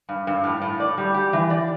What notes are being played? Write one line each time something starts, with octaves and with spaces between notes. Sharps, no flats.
G2
G2
A2
A2
D5
G3
G4
E3
D5